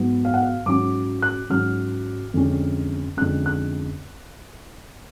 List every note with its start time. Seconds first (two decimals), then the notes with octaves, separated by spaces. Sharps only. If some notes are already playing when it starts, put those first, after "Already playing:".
Already playing: G#2 F#3 B3
0.25 F5
0.34 F#5
0.43 F5
0.66 G#2 F#3 C#4 D6
1.22 F#6
1.50 G#2 F#3 C#4 F6
2.34 F2 D3 G#3 C#4
3.17 F2 D3 G#3 C#4 F#6
3.46 F#6